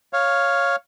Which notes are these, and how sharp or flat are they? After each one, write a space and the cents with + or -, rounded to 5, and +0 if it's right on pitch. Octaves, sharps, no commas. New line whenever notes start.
C#5 +0 F5 +0